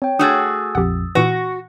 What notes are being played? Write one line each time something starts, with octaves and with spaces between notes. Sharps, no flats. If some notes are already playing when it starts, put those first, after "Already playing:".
C4 C#5 G5
A3 D4 F#4 G#4 D#6 E6 A6
A#1 F2 G4 F#5
A#2 E3 F#4 C#6 A#6